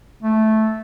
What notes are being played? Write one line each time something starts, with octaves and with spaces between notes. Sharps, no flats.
A3